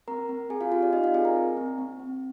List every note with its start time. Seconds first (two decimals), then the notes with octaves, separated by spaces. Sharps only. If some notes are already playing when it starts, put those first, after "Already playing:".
0.08 C4 A#4 A#5
0.29 C4
0.50 C4 G#4 G#5
0.61 F4 F5
0.72 F4 G4 F5
0.83 D5
0.93 C4 D#4 D#5
1.03 F4 F5
1.14 C4 G#4 G#5
1.25 A#4 A#5
1.36 C4
1.57 C4
1.78 C4
2.00 C4